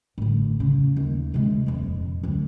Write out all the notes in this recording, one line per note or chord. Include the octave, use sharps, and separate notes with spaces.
A1 D3
C#3
D#2 F4
C3 G#3
D#1 F2
D2 F#3